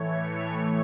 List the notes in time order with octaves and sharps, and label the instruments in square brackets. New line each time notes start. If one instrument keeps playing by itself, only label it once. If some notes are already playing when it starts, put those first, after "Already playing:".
Already playing: [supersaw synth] A2 E3 A3 C#5